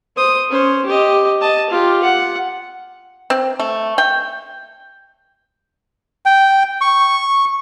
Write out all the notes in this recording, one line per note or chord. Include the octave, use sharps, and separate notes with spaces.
C5 D#6
C#4 C5
G4 D#5
D#5 A5
F4 G4
F#5
C4
A3
G5
G5
C#6